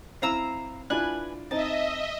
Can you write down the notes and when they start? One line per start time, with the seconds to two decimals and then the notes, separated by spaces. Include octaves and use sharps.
0.22 C4 E4 F5 A#5 E6
0.90 D4 E4 F4 B4 G#5 F#6
1.51 C4 D#4 D#5 E5 A5